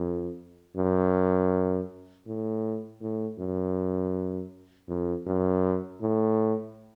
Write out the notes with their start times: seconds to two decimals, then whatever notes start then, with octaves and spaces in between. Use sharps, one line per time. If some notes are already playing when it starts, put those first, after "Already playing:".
Already playing: F2
0.77 F#2
2.26 A2
3.01 A2
3.39 F#2
4.88 F2
5.27 F#2
6.01 A2